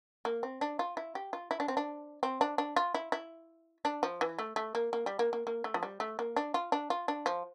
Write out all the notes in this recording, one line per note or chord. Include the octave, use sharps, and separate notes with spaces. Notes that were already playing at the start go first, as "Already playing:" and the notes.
A#3
C4
D4
F4
E4
G4
F4
E4
D4
C4
D4
C4
D4
D4
F4
E4
E4
D4
F3
E3
A3
A3
A#3
A#3
G3
A#3
A#3
A#3
A3
F3
G3
A3
A#3
D4
F4
D4
F4
D4
F3